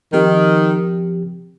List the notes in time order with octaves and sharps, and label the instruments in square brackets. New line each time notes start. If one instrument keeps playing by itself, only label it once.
[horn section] D#3 [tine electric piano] F3 C4 G4